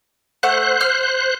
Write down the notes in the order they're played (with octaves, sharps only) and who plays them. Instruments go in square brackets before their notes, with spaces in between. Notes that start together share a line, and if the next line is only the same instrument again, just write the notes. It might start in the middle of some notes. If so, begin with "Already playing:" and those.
[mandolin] A3 F#5 [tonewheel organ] C5 F#6
[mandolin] F6